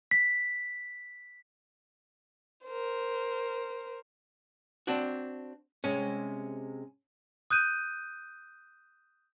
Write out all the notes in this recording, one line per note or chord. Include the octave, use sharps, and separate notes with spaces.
B6
A#4 C5
C4 D4 F#4
C3 G#3 C#4
D#6 F#6 G6 D#7